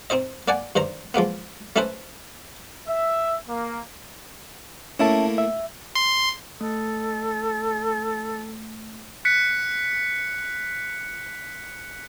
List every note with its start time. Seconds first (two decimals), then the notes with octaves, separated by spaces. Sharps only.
0.10 C4 D#4 C5 D#5
0.48 A#3 D5 F#5 G#5
0.76 G2 D#3 C5 A#5
1.14 F3 G#3 A#3 B3
1.76 A3 C#4 D#4 E4 B4 C5
2.88 E5
3.48 A#3
4.99 A3 A#3 C#4 E4 E5 A5
5.38 E5
5.95 C6
6.61 A3 A4
9.25 F#6 B6 C#7